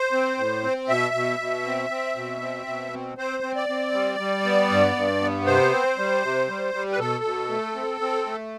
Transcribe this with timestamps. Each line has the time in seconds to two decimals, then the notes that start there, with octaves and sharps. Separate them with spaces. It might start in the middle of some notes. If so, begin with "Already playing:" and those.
Already playing: C5
0.12 C4
0.38 A2
0.63 C4
0.89 B2 E5
1.14 B2
1.40 B2
1.65 C4
1.90 C4
2.16 B2
2.42 C4
2.67 B2
2.92 C4
3.18 C4 C5
3.43 C4
3.56 D5
3.69 C4
3.94 G3
4.19 G3
4.45 B3
4.71 G2
4.95 G2
5.21 B3
5.46 C3 C5
5.72 C4
5.97 G3
6.23 C3
6.48 G3
6.74 G3
6.92 B4
6.99 B2 A4
7.24 B2
7.50 A3
7.75 C4
8.01 C4
8.26 A3